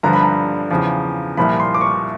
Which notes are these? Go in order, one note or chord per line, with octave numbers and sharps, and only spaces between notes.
G2 D3 F3 A#5
B5
A#5
E2 C#3 F3
C2 A#2 F3 B5
C6
D6
C#6